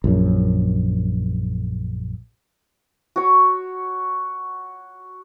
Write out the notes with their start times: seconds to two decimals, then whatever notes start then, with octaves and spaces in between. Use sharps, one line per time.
0.04 A#1 F#2
3.16 F#4 C#5